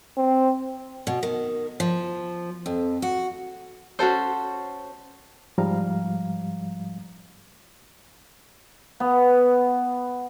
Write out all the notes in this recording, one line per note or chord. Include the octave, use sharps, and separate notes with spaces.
C4
B2
D#3
F3
F2
F#4
C#4 F#4 A4 C5
G#2 F3 G3 F5 A#5
B3